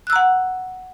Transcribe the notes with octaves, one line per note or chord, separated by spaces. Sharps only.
F#5 A#5 E6 F#6